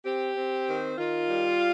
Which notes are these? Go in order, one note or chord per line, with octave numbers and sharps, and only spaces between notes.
C4 G4
C4
D#3
D#3 F4
G3